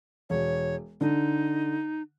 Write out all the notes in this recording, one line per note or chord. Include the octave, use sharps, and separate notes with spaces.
E1 C#5
D3 D#4